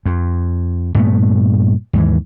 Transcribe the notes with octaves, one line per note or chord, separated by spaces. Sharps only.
F2
G2 A#2 A3 B3
D#2 G#2 E3